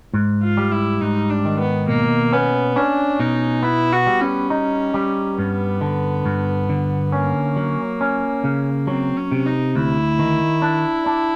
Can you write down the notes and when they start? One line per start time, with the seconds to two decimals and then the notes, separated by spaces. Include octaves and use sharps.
0.14 G#2
0.43 F4
0.57 G3
0.72 E4
1.01 G#2 D#4
1.30 D4
1.45 D#3
1.59 B3
1.88 B2 A#3
2.33 B3 C#4
2.76 C#4 D4
3.20 B2 D#4
3.63 B3 E4
3.92 F#4
4.07 G3
4.21 C#4
4.50 D#4
4.94 G3
5.38 G2 B3
5.81 D3
6.25 G2
6.69 D3
7.12 A#3 C#4
7.56 F#3
8.01 C#4
8.44 C#3
8.87 F#3 C4
9.17 C#4
9.31 C3
9.46 D#4
9.75 D2 E4
10.19 D#3
10.62 D4
11.06 D4